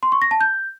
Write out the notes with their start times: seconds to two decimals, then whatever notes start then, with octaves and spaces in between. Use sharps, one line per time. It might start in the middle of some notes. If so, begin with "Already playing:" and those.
0.03 C6
0.12 C#6
0.22 A#6
0.31 A5
0.41 G6